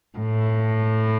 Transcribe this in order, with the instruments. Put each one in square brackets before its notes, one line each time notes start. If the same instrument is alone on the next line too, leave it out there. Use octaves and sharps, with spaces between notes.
[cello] A2